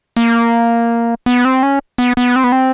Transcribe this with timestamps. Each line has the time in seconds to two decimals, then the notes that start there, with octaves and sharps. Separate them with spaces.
0.17 A#3
1.26 B3
1.45 C4
1.63 C#4
1.98 B3
2.17 B3
2.36 C4
2.44 B3
2.52 C4